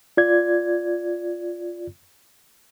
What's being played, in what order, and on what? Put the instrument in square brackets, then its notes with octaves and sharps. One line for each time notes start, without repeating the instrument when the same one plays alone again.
[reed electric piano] F4 D5 G#6